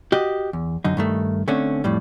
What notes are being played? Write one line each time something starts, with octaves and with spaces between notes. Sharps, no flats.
F#4 G4 D#5
E2
F#2 D3 D#4
G2 D#3 A3
D3 A3 C4 C#4
F2 A2 G3